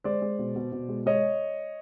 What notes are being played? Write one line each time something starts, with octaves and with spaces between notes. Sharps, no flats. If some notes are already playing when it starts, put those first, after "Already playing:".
G#3 C5 D5
G#3
B2
B2
B2
G#3
G#3 C#5 D#5